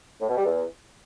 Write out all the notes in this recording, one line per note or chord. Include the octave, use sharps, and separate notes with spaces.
A2
B2
G3
E2